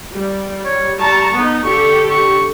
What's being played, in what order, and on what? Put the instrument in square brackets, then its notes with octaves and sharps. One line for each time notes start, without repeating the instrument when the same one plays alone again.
[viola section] G3
[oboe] C#5
[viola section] G3 A5 A#5 [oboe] C#6
[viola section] B3 D#4
[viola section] D3 G4 A4 [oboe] C#6
[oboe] C#6